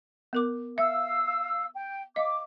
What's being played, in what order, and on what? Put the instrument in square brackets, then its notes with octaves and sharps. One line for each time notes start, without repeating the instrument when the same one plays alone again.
[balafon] B3 A#4 D6
[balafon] E5 [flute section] F5 E6
[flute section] G5
[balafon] D#5 F5 [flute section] D6